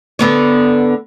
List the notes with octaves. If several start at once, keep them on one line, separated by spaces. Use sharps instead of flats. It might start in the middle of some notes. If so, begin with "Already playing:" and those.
D3 B3 C#5